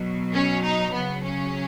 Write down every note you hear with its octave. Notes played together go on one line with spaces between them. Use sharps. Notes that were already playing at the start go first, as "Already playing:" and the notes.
Already playing: B2 F#3
C#4
D#4
C#3 F#3 B3
C#4